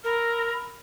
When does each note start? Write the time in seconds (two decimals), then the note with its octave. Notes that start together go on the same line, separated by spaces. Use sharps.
0.04 A#4 B5 E6 F6